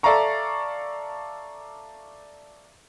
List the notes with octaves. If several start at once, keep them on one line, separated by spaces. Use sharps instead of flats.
A4 D5 E5 F5 A#5 C#6